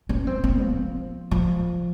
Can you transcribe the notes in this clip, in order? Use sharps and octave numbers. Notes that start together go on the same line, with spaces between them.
C#4
C4
C4
F3
F3